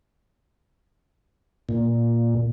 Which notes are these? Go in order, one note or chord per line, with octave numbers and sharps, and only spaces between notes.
A#2